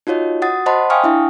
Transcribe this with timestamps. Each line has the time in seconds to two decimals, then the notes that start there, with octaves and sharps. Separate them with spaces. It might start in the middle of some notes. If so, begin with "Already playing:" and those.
0.07 D#4 F4 F#4 C#5 D#5
0.42 F#4 F#5 D#6 A6
0.66 C5 D#5 F#5 A5 B5 C6
0.90 F5 G5 G#5 C#6 D#6 F6
1.03 D4 E4 E5